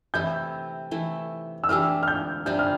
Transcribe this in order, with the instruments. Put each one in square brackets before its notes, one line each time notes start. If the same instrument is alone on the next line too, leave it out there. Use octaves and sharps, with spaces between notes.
[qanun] C3 E3 A3 E4 [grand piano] G6
[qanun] E3 A3 E4
[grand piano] E6
[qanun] E3 A3 D4 G4 [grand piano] F6
[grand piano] F6
G6
[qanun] C3 G3 D4 [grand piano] G6
[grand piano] F6